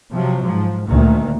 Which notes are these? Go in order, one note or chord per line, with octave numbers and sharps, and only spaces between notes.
C3 F3 F#3
G#2 F3
D2 A#2 D#3